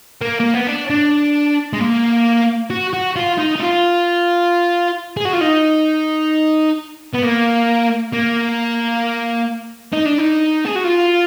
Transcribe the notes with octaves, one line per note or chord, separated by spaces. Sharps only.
A#3
A#3
B3
D4
D4
G#3
A#3
F#4
F#4
F4
D#4
D#4
F4
G#4
F#4
F4
D#4
B3
A#3
A#3
D#4
D4
D#4
G#4
F#4
F4